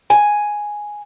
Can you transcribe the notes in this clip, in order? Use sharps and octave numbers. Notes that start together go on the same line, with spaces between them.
G#5